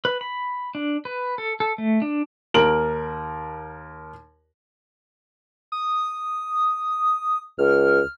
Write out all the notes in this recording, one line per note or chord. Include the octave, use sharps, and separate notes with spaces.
B4
B5
D4
B4
A4
A4
A3
D4
D#2 A#4 D7 F#7
D#6
C#2 F6